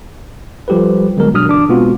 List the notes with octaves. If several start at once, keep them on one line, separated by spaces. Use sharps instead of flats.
F3 G3 G4 A4 B4
D3 F#3 G#3 B3 A#4
G#1 B2 F#3 D4 D#6 F6
G1 E3 D4 D6
B2 G#3 B3 C4 F4 F#4